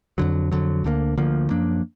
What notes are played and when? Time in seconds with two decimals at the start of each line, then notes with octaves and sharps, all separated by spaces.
0.18 F2 D3 F#3
0.52 F2 D3 F#3
0.84 D2 D3 F3 A#3
1.18 D2 D3 F3 A#3
1.50 F#2 F3 A#3 D4